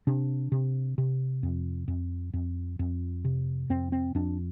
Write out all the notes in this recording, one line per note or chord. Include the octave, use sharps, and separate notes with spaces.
C3 D4
C3
C3
F2
F2
F2
F2
C3
F2 C4
C4
F2 D4